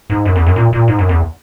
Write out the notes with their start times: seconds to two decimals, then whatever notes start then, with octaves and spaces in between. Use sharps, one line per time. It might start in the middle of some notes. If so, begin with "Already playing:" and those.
0.10 G#2
0.25 F#2
0.36 E2
0.46 F#2
0.56 A#2
0.73 A#2
0.88 G#2
0.99 F#2
1.09 E2